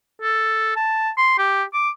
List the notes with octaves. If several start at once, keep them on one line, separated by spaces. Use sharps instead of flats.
A4
A5
C6
G4
D6